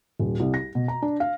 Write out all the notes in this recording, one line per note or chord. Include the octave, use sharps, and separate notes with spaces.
D#1
C2
A#6
B2
A#5
D4
F5